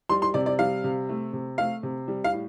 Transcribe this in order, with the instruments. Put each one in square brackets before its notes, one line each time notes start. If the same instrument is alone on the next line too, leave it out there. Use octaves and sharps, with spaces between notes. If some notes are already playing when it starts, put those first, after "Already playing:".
[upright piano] G3 C6
C6
C3 D5
D5
G3 F5
C3
A3
C3
A3 F5
C3
G3
F5
A2